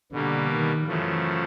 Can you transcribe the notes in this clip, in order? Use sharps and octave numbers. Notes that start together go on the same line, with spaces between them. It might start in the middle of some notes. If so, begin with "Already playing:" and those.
B2 D3 G3 A#3
D#3
F#2 C#3 E3 F3 A3